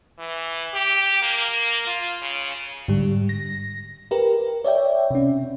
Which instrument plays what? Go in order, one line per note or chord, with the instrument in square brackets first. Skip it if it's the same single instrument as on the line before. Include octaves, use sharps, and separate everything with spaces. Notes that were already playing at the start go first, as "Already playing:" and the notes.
[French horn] E3
G4
A#3
F4
C#3
[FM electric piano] G#2 D3 G3
A#6
G4 A#4 B4
C#5 D5 E5 G5
C3 C#4